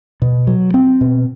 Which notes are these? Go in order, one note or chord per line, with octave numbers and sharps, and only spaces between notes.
B2
F#3
C4
B2